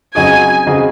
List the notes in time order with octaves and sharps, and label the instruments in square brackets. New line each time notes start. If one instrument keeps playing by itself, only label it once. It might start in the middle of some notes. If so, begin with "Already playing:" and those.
[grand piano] C#3 F#3 C4 D#4 G#4 [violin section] G#5
[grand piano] C#3 F#3 C4 D#4 G#4